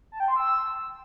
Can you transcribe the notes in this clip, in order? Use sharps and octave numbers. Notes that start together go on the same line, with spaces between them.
A5
G5
C6
E6